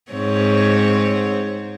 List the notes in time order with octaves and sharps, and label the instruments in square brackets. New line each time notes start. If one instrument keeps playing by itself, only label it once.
[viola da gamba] G#2 C4 C#5